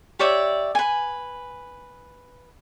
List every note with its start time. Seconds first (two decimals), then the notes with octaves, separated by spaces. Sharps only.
0.19 G4 C#5 D5 E5
0.75 B4 G#5